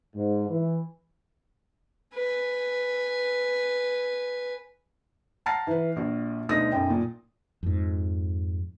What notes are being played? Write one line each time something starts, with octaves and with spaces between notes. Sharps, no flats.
G#2
E3
B4 G#5
F#5 A5 A#5 F6 A6 C7
E3 B4
A#1 F#4
D2 B2 D3 D#4 D#6 A#6
B1 F#2 G5
A#2
F2 G#2